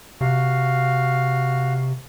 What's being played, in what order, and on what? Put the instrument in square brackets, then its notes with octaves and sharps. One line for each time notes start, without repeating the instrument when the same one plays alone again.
[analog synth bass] C3 [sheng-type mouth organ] F#4 F5